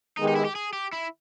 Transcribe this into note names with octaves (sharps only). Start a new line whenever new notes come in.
D#3 G#3 B3 D#4 G4
D#4
E4
G4
G#4
G4
E4